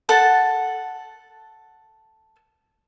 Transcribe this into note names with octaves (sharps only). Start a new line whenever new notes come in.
A4 F#5 A5